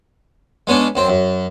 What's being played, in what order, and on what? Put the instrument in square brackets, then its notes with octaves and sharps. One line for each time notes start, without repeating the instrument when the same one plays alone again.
[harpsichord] G#3 B3 C#4 D4
F#2 C4
F#2